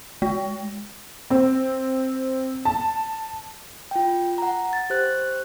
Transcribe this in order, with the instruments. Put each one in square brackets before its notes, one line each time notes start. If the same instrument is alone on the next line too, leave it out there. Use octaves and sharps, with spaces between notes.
[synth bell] G#3
[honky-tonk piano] C4
A5
[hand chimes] F4 G5
F#5 A#5
A6
G4 C5 F#6